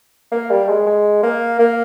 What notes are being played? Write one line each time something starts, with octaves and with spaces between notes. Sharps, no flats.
A#3
G3
G#3
G#3
A#3
A#3